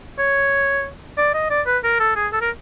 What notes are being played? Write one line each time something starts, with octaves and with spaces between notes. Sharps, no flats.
C#5
D5
D#5
D5
B4
A#4
A4
G#4
A4
A#4